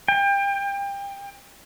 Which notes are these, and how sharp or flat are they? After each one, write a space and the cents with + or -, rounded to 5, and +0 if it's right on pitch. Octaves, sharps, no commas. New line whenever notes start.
G5 +30